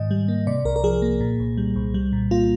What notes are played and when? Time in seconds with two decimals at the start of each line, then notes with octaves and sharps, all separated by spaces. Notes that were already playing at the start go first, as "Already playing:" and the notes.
Already playing: G#2 D#3 D#5
0.11 G3
0.28 A#3
0.47 C3 D5
0.65 C2 A#4
0.76 A#4
0.84 F3 G#4
1.02 A#3
1.21 A#2
1.40 C2
1.57 G3
1.76 C2
1.94 G3
2.13 A#2
2.31 A#3 F4